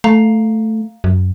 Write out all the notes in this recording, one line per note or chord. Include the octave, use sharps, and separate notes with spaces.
A3 F5 A#5
F#2